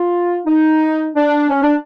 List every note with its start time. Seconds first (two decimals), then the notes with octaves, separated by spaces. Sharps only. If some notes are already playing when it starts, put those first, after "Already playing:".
Already playing: F4
0.46 D#4
1.15 D4
1.49 C#4
1.62 D4